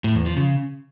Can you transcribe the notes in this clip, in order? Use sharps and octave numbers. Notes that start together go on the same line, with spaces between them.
A2
E2
F3
C#3